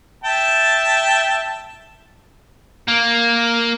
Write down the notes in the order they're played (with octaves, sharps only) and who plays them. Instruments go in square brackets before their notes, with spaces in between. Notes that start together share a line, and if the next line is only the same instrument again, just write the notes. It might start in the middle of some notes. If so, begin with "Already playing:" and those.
[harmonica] E5 G5 A5
[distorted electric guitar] A#3